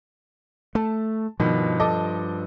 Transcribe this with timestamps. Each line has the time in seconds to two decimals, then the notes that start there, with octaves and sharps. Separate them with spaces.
0.75 A3 A5
1.40 G2 B2 D#3 F3
1.80 A4 D#5 D6